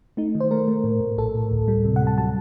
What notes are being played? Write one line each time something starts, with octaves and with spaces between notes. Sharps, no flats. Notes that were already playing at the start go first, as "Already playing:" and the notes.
A3 D#4
D#3
C5
A3 A#4
A3
A2
A2
A#1 A4
A2
D2
G3
C3
F#5
G3
A5
F#3 A5